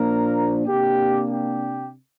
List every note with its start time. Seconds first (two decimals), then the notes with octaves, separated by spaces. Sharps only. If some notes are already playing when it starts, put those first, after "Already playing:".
Already playing: A#2 F3 A#3 D4 A#4
0.67 C3 A#3 D4 G4
1.31 G4